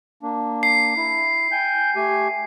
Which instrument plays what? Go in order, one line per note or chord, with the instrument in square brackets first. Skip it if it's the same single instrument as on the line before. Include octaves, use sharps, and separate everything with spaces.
[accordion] A#3 D4
[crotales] C7
[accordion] E4
G5 G#5 G6
A3 G4 G#5